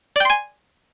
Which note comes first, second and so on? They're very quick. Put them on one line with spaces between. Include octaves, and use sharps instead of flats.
D5 G5 C6 G#5